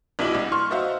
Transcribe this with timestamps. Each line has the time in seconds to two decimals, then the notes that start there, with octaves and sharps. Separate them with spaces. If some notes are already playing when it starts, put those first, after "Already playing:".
0.19 A#1 B2 E4 D#5 D6 F#7
0.35 C2
0.52 C6 C#6 F6
0.71 D#4 F#4 C5 E5 F5